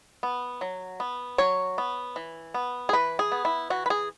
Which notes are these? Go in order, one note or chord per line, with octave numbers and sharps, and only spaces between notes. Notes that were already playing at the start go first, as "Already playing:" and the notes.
B3
F#3
B3
F#3 C#5
B3
E3
B3
G#4
E3 B4
G#4
B3
E4
E3 F#4
B4
G#4